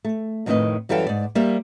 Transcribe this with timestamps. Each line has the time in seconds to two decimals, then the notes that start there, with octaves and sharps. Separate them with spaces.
0.05 A3
0.46 F2 A2 D#3 C4 B4 D#5
0.89 F#2 E3 G3 A4 F5 G5
1.07 G#2 D5
1.35 G3 A#3 G4 C5 E5